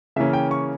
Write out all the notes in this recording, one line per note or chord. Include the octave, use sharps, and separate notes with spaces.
C#3 E3 A#3 C#4 E5
G5
C#6